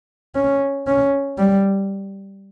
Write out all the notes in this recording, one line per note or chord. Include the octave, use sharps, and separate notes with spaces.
C#4
C#4
G3